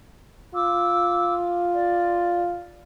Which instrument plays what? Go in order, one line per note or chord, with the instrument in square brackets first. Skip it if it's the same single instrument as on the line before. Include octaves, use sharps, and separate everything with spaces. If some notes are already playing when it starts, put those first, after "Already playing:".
[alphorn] F4 [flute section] D6 E6
[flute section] D5